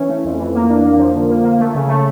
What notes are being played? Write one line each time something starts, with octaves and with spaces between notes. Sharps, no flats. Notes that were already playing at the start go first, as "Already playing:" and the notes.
Already playing: E3 C#4
A3
F2
E3
A#3
D4
A#3
F3
D3
A#3
A#3
A3
C#3
A3